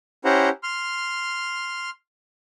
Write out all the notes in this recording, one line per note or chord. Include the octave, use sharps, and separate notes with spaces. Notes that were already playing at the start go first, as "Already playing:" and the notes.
C#4 E4 G4 C5 F#5 A#5
C6 F6